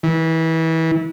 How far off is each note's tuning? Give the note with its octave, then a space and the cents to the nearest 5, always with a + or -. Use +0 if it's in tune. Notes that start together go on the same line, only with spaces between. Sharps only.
E3 -25